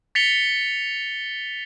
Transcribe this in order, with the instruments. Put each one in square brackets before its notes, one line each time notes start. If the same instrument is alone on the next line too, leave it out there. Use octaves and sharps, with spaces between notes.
[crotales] A6 B6 C#7 F7 G7